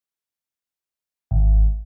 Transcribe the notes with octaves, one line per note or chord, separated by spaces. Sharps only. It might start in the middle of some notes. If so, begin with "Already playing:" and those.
G#1